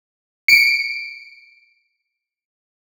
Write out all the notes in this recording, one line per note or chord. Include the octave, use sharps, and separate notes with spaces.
C#7 D7